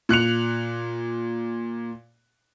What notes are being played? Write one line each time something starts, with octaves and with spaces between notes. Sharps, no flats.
A#2 F#6 C#7 F7